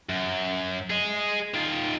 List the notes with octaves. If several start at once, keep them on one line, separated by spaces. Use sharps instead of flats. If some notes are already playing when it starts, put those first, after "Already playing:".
F#2
G#4 D#5
D#3 F4